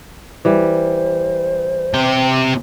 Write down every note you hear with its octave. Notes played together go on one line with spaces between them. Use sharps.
E3 G3 C5
C3 G5